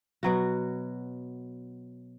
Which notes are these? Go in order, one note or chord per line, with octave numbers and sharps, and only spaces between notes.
B2 F#3 F#4